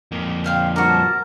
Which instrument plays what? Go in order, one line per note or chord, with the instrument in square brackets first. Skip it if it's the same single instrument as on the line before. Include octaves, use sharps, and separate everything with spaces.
[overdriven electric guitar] F2 A#3
[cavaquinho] C5 F5 G5
[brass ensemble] G2 F3 A5 [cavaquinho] F#4 D6 [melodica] A#4